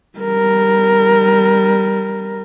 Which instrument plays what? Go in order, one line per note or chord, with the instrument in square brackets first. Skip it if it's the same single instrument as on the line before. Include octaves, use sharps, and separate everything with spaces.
[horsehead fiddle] G3 A#4